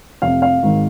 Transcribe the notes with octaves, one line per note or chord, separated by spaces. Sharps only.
F1 F2 C3 F5
F5
G#1 G#2 D#3